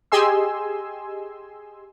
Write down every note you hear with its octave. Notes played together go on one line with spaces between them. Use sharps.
G4 G#4 D#5 G#5 C6 E6